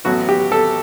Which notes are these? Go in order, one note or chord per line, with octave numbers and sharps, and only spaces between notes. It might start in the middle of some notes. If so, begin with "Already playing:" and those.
A1 A2 F#3 B3 F#4
G4
A4